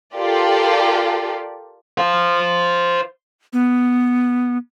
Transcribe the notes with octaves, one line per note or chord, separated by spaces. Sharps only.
F4 G4 A4 A#4 D5
C5 F5
B3